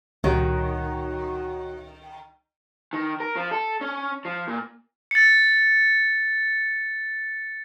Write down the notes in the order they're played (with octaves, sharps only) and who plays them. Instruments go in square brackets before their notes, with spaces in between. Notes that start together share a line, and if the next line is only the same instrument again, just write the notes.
[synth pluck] C#2 A#2 G3 [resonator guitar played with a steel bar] D#3 [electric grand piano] D#4 F#4 C#5
[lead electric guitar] D#3
A#4
F3
A4
C#4
F3
A#2
[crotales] A6 C#7